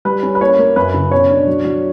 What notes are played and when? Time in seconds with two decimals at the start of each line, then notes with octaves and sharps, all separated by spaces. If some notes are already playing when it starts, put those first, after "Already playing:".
0.05 G3 B4
0.23 C#4
0.35 B4
0.41 A#3 C#5
0.59 A#3
0.76 F#2 B4
0.94 C#3
1.11 B2 C#5
1.30 D4
1.47 F#3
1.65 F#3